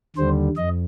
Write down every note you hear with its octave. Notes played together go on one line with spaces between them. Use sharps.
D#2 D3 G3 C5
F2 D#5